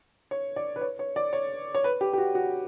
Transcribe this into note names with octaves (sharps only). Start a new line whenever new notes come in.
C#5
D5
B4
C#5
C#5
D5
C#5
C#5
B4
G4
G4
F#4
F#4